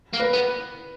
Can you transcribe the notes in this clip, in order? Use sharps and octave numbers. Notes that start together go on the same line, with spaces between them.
A#3
B4
B3